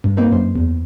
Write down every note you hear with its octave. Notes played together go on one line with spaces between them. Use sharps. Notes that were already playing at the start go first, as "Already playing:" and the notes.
G2
A#3 C4 D#4 B4
F#2 C5
E2